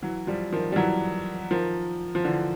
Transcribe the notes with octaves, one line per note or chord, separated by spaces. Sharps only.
E3 F#3
F3 G3
D#3 F3
G3
E3 F#3
D#3 F3
F3
D3 E3